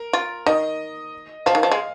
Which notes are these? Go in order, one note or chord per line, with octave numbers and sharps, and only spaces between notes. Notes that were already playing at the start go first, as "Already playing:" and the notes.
Already playing: A#4
F4
D#3 D#5
F3 F5
D#3
F3
G#3